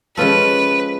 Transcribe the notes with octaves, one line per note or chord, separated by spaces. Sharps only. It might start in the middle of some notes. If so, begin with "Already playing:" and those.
F3 G#3 C#4 F4 A4 B4